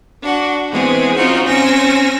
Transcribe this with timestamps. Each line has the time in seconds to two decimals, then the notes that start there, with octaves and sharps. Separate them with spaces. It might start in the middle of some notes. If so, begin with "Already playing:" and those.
0.21 D4 F#4 F#5
0.70 E3 G#3 B3 C4 G#4
1.15 C4 C#4 D#4 F4 F#4 C5
1.44 C4 C#4 G#5 E6 A#6